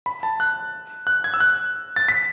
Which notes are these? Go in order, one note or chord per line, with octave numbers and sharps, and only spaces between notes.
B5
A5
F#6
F#6
G#6
E6
F#6
A6
B6